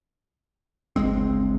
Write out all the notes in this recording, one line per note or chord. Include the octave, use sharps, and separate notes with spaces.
G1 C#2 G#3 C4